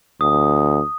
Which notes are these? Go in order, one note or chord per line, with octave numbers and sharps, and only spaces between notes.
D2 D#6